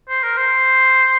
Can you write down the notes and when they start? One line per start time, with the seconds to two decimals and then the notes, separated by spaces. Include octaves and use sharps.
0.09 C5
0.23 A#4
0.37 C5